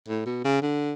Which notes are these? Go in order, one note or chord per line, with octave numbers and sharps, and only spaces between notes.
A2
B2
C#3
D3